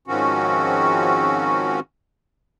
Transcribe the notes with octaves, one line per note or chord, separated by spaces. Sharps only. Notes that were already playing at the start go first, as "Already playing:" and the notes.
G#2 D#3 F3 C4 C#4 F#4